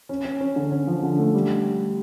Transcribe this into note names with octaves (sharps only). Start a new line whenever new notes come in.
C#4
C#4
C#4
D3
C#4
F3
D3
A3
G3